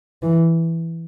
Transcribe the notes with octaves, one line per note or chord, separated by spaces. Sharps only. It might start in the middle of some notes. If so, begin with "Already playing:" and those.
E3